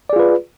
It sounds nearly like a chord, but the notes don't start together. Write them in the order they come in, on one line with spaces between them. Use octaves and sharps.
D5 G#4 F4 B4